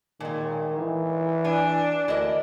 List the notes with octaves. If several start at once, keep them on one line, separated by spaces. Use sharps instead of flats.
A#2 D#3 G#3
E3
D4 G#5
D2 E4 A#4 D#5